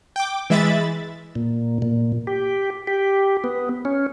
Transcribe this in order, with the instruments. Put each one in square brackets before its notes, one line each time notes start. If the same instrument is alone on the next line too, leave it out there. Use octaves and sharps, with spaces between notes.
[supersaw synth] G5 D6
E3 G#3 E5 B5 A6
[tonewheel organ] A#2
A#2
G4
G4
B3
C#4